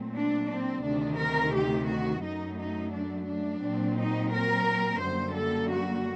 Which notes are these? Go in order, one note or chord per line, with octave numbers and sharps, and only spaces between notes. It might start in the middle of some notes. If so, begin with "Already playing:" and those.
Already playing: A#2 F#3 A3 C4
D4
C4
D2 C3 D#3 D4
A#4
G4
F#4
F#2 F#3 A3 D#4
D#4
D4
D4
A#2 F#3 C4
D#4
A#4
F#2 D3 G3 A#3 C5
A4
F#4